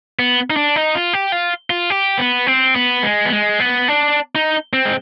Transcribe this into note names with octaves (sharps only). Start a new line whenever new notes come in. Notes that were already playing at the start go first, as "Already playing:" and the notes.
B3
D#4
D4
D#4
F4
G4
F4
F4
G4
B3
C4
B3
G#3
B3
G#3
B3
D4
D#4
C4
G#3